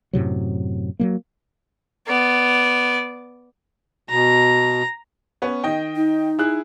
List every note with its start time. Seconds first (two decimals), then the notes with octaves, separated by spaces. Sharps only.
0.13 F#2 A2 C3 F#3
0.99 F#3 G3 A#3
2.07 B3 D5
4.10 B2 A#5
5.42 B3 C#4
5.64 D#3 D#5 G5
5.95 D#4
6.39 E4 G#4 F#6